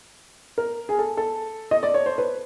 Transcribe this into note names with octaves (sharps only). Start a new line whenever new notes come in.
A#4
G#4
A4
A4
D#5
D5
C#5
C5
B4